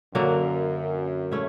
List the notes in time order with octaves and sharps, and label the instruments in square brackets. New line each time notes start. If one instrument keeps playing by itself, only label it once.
[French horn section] F#2 [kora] D3 F#3 A#3
[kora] A3 C#4 E4